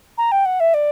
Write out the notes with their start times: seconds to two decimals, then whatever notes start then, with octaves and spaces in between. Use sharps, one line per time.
0.18 A#5
0.32 G5
0.45 F#5
0.60 E5
0.74 D5